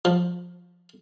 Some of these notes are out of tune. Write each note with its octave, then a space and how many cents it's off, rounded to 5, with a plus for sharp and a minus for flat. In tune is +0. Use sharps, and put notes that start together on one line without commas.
F3 +15